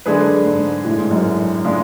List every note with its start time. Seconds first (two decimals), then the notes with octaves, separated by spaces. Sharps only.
0.06 F#2 D3 G#3 D4 G#4 B4
0.46 G#2
0.85 A2
0.98 G#2
1.11 F#2
1.65 C#3 G#3 D4 F4